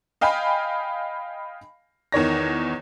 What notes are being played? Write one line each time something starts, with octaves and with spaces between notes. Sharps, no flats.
D#5 F5 G5 G#5 B5
E2 D#3 C#5 A#6